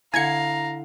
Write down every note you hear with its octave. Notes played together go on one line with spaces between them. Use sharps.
D3 E4 F5 G#5 A#5 G#6 C#7